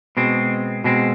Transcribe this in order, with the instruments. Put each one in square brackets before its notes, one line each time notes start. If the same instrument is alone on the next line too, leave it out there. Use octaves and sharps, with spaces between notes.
[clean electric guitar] B2 G#3 C4
B2 G#3 C4